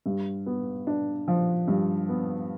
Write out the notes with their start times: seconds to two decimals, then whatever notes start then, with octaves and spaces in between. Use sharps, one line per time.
0.06 G2
0.46 B3
0.87 D4
1.28 F3
1.68 G2
2.09 B3